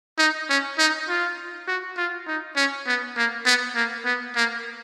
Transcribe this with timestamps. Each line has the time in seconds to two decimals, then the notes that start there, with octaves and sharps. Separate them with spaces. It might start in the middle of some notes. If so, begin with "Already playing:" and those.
0.18 D#4
0.49 C#4
0.78 D#4
1.08 F4
1.68 F#4
1.97 F4
2.27 D#4
2.56 C#4
2.87 B3
3.17 A#3
3.45 B3
3.75 A#3
4.05 B3
4.36 A#3